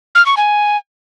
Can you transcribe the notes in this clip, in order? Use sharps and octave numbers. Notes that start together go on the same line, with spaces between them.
F6
C#6
G#5